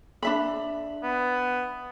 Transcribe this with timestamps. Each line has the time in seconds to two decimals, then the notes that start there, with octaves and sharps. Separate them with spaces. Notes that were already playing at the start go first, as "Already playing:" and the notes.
0.23 D4 E5 B5
1.03 B3